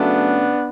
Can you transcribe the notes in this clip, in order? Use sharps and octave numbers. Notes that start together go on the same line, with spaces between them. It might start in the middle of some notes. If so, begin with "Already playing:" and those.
Already playing: C#3 F#3 A3 B3 D4